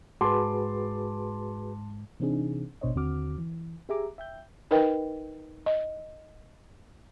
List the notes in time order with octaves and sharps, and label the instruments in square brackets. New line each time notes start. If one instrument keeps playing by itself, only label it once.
[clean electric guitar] G#2 [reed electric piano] F#4 G#4 B4 [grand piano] A5 C6 D6
[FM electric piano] C3 E3 C4 D4 D#4 G#4
G#1 B2 D4 C5 C#5 D#5
D#2 D3 C4 F#4 D6 F6
E3
G4 G#4 E5 G#5 A#5 D6
E5 G5 G6
[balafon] D#4 A#4 B4 D#5 G5
D#5